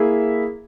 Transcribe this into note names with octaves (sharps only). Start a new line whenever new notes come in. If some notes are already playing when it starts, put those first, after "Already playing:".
Already playing: A#3 E4 G#4 E5